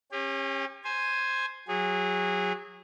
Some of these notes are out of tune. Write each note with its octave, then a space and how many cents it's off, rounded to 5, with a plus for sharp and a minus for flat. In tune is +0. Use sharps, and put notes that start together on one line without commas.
C#4 -25 G4 +35
C5 +0 G#5 +0
F#3 -10 G#4 -25